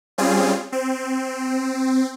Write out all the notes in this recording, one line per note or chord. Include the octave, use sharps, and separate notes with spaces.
G3 C4 C#4 F4 G#4
C4